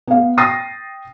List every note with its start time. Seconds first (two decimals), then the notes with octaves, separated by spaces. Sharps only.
0.07 B3 F5
0.38 G5 D#6 A6 A#6 C7